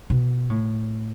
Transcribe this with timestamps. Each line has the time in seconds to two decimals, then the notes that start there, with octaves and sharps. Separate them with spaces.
0.10 B2
0.50 A2